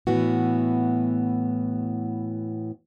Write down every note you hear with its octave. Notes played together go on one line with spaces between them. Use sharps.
A2 E3 B3 F#4